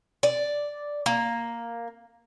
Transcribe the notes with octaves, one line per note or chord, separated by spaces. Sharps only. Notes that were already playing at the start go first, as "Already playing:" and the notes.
D5
A#3